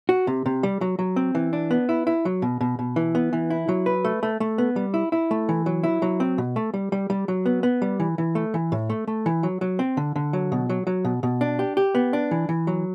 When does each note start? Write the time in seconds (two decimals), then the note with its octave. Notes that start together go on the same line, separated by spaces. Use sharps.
0.09 F#4
0.27 C3
0.46 C3
0.63 G3
0.81 F#3
0.99 F#3
1.16 C4
1.35 E3
1.53 D4
1.71 B3
1.89 E4
2.07 E4
2.25 F#3
2.42 B2
2.61 B2
2.79 B2
2.96 E3
3.15 B3
3.33 E3
3.50 E4
3.69 F#3
3.86 B4
4.05 A3
4.23 A3
4.40 A3
4.58 B3
4.76 G3
4.94 E4
5.12 E4
5.31 A3
5.49 E3
5.66 F#3
5.84 E4
6.02 F#3
6.20 C4
6.38 B2
6.56 A3
6.74 G3
6.92 G3
7.10 G3
7.28 F#3
7.46 B3
7.63 B3
7.82 G3
8.00 E3
8.18 E3
8.35 A3
8.54 E3
8.72 A2
8.90 A3
9.07 A3
9.26 E3
9.43 F#3
9.61 F#3
9.79 C4
9.97 D3
10.16 D3
10.33 F#3
10.52 B2
10.70 F#3
10.87 F#3
11.05 B2
11.23 B2
11.41 D4
11.59 G4
11.77 G4
11.95 B3
12.13 D4
12.31 E3
12.49 E3
12.67 F#3